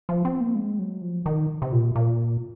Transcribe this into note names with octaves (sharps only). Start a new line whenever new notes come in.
F3
C4
A#3
G#3
F#3
F3
D#3
C3
A#2
A#2